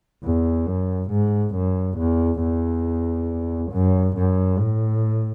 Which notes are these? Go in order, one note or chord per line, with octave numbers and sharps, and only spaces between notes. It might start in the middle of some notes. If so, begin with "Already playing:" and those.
E2
F#2
G#2
F#2
E2
E2
F#2
F#2
A2